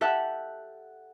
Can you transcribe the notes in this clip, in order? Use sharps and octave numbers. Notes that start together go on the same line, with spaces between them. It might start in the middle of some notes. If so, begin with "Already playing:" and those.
G4 A4 E5 F#5 F#6